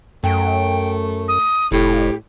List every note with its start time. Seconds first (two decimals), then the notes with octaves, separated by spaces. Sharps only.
0.24 F#2 A3 G5
1.28 D#6
1.72 F1 A2 G4